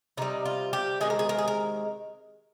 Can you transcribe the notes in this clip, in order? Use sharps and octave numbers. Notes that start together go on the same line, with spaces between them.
C3 G3 D#4
F4
G4
C3 D#3 G#3 G#4
A#4
G#4
A#4
G#4
A#4